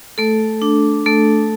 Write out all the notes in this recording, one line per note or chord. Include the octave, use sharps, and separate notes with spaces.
A3 A4
D4
A3 A4